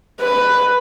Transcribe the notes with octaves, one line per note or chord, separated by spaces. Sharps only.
B4